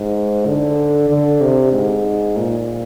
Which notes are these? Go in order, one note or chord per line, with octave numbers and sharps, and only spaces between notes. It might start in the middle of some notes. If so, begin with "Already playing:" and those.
Already playing: G#2
D3
D3
C3
G#2
A#2